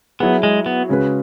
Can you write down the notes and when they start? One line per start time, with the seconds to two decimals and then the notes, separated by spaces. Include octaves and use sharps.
0.20 F#3 B3 E4 G#4
0.43 G#3
0.66 B3
0.89 C#3 G#3 C#4 F#4 B4